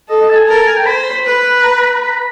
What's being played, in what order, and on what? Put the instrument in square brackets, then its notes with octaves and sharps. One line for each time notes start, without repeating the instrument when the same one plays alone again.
[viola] A4 [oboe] D#5
[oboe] D#5
A5
G#5
[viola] A#4 [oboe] A5
[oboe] A5
G#5
G5
[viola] C5 [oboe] B5
[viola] B4
[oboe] A#5
B5
A#5
B5
A#5
B5
A#5
B5